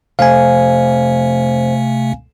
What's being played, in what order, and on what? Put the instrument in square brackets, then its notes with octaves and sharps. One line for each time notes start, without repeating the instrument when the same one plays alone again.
[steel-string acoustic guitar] F2 [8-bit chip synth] C3 A3 [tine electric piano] F5 G#5